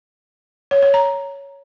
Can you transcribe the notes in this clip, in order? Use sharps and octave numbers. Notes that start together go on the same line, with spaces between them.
C#5
C#5
A#5